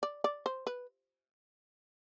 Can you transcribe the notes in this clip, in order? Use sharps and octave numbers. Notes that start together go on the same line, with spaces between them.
D5
D5
C5
B4